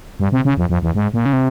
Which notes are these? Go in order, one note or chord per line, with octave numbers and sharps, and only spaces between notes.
G2
C3
C#3
F2
F2
E2
G#2
A#2
C#3
C3